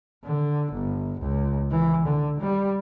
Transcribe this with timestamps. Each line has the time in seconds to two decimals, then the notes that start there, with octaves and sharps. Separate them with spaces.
0.24 D3
0.72 G1
1.20 C#2
1.70 E3
2.05 D3
2.40 G3